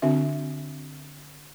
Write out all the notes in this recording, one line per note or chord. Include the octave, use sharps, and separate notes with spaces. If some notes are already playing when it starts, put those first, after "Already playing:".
D3 C4 D4 F#4 E5